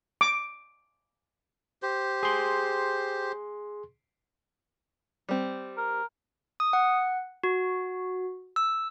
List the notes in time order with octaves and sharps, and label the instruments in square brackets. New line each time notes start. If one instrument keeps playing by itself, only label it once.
[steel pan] D6
[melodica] G4 C5
[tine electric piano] G#4 C6
[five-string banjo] G3 C4
[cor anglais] A#4
[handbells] D#6
F#5
F#4
E6